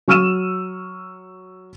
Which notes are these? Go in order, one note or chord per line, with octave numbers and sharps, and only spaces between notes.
F#3 C#6 E6 F6 D#7 E7